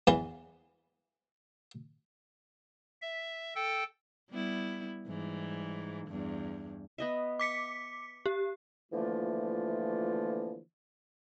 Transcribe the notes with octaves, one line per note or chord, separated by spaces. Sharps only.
E2 E3
E5
A4 G5
G3 B3 E4
G#2 E3 G3
E2 G2
B3 D#5 E5
D6 B6 C#7
G4
D3 E3 F3 A3 A#3 F4